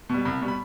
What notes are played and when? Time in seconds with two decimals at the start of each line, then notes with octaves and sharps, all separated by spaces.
0.09 B2 G3
0.25 C2 B5
0.41 B2 G3
0.48 B5